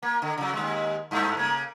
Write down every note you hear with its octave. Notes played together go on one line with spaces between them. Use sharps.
A#3
D3
C#3 F#3
D#2 G#3
G2 A3
C#3 A#3